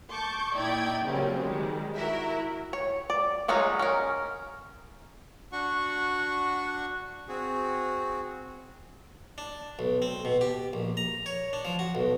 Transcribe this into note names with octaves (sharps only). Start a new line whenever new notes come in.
A5 C#6 D6 G6
A#2 D#4 E4 D5 G5 G#6
C#3 F#3 G3 A#3 C4 C#4
D#3 G3 G#3
E4 F#4 A#4 E5
C#5
D5
F#3 G#3 C#4 D#4 F4
C#4 A#4
D4 F#4 F#5 C#6
C4 F#4 G#4
D4
B1
C4
B2
G4
A#1
A#5
C#5
D4
F3
F#4
B1